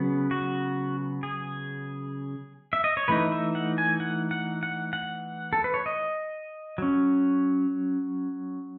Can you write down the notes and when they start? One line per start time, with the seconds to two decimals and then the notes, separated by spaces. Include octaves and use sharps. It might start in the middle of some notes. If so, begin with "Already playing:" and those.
Already playing: C#3 F#3 B3
0.31 F#4
1.23 G#4
2.73 E5
2.84 D#5
2.97 C#5
3.08 E3 A3 D#4 B4
3.32 E5
3.55 F#5
3.78 G#5
4.00 F#5
4.31 F#5
4.63 F#5
4.93 F#5
5.53 A4
5.64 B4
5.74 C#5
5.86 D#5
6.78 F#3 C#4